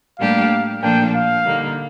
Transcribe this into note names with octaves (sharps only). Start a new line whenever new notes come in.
A2 G3 A#3 D4 G4 F5
A#2 F3 A#3 D4 A4 G5
F5
D3 G3 A#3 D#4